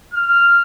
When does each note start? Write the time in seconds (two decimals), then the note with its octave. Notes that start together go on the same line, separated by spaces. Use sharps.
0.13 F6